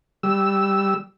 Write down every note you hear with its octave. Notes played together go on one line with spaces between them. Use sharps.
G3 E6